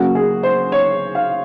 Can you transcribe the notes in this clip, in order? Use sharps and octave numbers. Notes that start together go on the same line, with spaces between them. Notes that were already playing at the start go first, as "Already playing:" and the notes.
Already playing: C#2 C#3 F#3 A#3 F#4
G#4
C5
C#5
F5